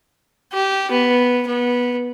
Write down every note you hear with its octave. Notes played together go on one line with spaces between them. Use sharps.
G4
B3
B3